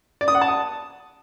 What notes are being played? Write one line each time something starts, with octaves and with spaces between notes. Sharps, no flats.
D5
D#6
F#5
A5
D#6